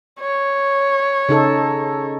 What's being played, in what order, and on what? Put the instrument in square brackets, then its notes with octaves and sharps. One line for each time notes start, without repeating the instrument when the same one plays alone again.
[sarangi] C#5
[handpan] C#3 D#4 A4